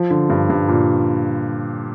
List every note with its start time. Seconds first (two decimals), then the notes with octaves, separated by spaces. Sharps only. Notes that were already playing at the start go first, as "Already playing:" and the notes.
Already playing: F3
0.10 D3
0.30 G2
0.50 G2
0.68 A#2